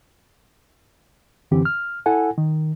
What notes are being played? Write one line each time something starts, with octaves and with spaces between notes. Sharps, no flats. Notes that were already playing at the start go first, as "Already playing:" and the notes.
F#2 D3 E3 C4 G4
F6
E4 A4 F#5 G#5
D#3